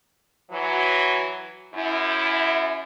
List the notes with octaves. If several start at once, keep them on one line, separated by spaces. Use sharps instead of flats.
E3 F#3
F#2 E4